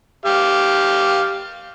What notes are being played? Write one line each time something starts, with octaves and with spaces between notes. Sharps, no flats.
G4 F5